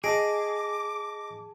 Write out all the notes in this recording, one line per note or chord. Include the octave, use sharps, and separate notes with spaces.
G#4 D#5 A5 D6 D7